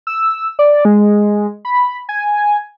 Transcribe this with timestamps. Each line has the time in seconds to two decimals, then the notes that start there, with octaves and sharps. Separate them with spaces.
0.07 E6
0.59 D5
0.85 G#3
1.65 B5
2.09 G#5